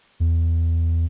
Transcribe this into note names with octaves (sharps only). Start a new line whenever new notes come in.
E2